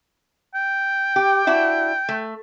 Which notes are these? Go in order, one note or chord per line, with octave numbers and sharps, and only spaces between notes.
G5
G4
D4 E4 F#4
A3